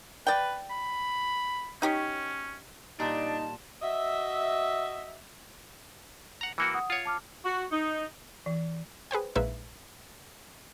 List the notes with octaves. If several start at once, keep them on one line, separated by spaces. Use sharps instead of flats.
B4 D5 G5
B5
C#4 D#4 G4 C#5
A#2 G3 D4 D#4 A5
F#4 D#5 E5
F#5 A#5
E3 A#3 F#4 E6 C#7 D7
F#5 D#6
F4 C#5
A5 D6 F6
F#4
D#4
E3
G#4 B4 C5 G5
A#1 G#3 D#4 B4 E5 F5